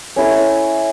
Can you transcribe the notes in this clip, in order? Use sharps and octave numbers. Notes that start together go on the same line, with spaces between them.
C#4 E4 A4 C#5